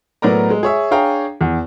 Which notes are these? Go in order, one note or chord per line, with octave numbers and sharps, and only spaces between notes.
A2 F#3 B3 A#4 D5 A#5
G#3
G#4 C#5 E5
D4 G#4 C#5 F5 G5 A#5
E2